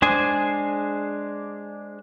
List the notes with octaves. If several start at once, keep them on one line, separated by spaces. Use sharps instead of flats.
G#3 D4 G#4 C5 G#5